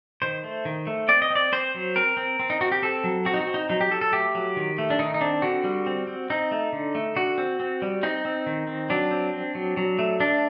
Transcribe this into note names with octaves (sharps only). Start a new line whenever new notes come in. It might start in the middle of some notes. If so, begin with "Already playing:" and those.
D#3 C5
A3
D#3
A3
C4 D5
D#5
C4
D5
C4 C5
F#3
C4 A#4
C4
C4
D#4
C4 F#4
G4
C4 A4
F#3
C4 F#4
D#4
F#4
C4
D#4
F#3 D#4
G4
F#3 A4
A4
A3 G4
F#3
D#3
A3
D4
D#3 D#4
D#4
C4 D4
D3 F#4
G3
C4
C4
C4 D#4
A3
D3
A3
D3 F#4
C4
C4
G3
C4 D#4
C4
D#3
C4
F#3 D4
C4
C4
F#3
F#3
A3
A3 D4